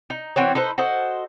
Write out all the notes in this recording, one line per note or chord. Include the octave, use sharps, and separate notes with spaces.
D#4
E3 C4 F#4 C#5
D#4 A4 B4 C5
F#4 A4 C5 D#5